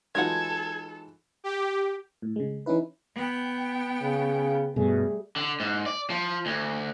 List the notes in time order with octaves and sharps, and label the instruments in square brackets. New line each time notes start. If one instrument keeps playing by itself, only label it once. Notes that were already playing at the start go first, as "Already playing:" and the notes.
[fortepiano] E3 F#3 F4 [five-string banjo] G#3 D#4 F#5 [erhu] A4 [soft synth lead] G#6
[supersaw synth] G4
[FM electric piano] A2
C#3 G#3
E3 C#4 D#4 E4 B4
[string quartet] B3 G5
[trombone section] C#3
[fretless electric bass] G2 B2 [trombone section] G3 A3 G#4
[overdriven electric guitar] D3
G#2
D5
F3
D2